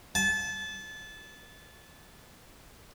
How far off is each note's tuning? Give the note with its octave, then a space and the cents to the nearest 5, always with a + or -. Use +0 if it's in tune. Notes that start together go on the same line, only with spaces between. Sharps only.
A5 -25